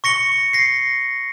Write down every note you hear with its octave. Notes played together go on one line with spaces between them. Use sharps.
C#6 A#6 C#7 G7
A#6 C7